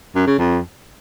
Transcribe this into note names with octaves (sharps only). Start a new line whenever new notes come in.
F#2
C#3
F2